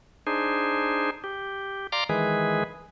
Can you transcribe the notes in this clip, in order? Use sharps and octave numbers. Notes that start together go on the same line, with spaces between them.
D4 D#4 G#4 C5
G4
D5 F5 A#5 C6 D6
D#3 E3 G#3 G#4 B4